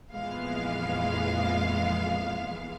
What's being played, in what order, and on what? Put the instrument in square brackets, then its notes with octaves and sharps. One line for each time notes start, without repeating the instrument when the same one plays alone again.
[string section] F2 A#2 E3 G#3 B3 F5